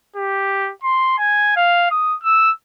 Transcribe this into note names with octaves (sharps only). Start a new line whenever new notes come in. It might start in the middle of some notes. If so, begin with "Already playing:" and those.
G4
C6
G#5
F5
D#6
E6